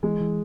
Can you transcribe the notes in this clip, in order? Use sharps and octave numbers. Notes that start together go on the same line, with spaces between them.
E3 G#3
E3